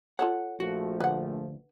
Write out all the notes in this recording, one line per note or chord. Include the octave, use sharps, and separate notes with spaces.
F4 A4 C#5 F#5
A#1 F3 A3 F#4
D2 B4 F#5